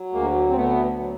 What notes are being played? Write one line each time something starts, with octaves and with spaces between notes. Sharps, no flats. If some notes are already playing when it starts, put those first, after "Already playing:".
Already playing: F#3
D2 G#3 A#3
C4
D2 A3 B3
F#3